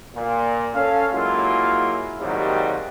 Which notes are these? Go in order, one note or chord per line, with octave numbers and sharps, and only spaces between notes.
A#2
C#4 A4 F5
F#3 G#3 A#3 E4 F4
D#2 G#2 C3 D#3 F#3 G3